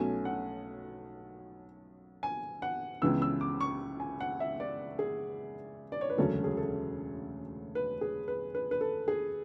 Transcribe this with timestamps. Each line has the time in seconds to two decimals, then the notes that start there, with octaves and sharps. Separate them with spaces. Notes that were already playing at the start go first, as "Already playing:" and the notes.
Already playing: B1 B2 A3 C#4 G#5
0.25 F#5
2.23 G#5
2.62 F#5
3.01 C#2 C#3 E3 B3 E6
3.22 E6
3.41 D6
3.61 C#6
4.00 G#5
4.20 F#5
4.40 E5
4.60 D5
4.99 G#4
5.92 D5
6.01 C#5
6.10 B4
6.17 E1 D2 C#3 F#3 C#4 A4
6.44 G#4
6.57 A4
7.75 B4
8.01 G#4
8.28 B4
8.55 B4
8.71 B4
8.81 A4
9.08 G#4